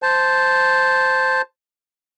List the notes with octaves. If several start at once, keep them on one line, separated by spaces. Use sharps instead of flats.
C5 A5